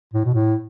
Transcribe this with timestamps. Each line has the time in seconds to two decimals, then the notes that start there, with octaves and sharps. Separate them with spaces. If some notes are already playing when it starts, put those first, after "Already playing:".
0.14 A2
0.25 B2
0.34 A2